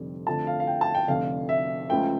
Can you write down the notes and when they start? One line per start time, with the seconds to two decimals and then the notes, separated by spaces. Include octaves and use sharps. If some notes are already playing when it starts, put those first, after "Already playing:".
Already playing: F1 F2 D3 G3
0.27 F2 D3 F3 A3 A5
0.47 F5
0.60 F5
0.67 G5
0.81 A5
0.95 G5
1.08 F1 F2 D3 F5
1.49 E5
1.89 C#2 C#3 F3 A3 G5